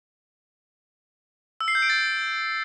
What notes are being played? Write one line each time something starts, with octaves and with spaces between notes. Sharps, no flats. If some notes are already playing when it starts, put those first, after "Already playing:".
E6
C7
G6
D7
A6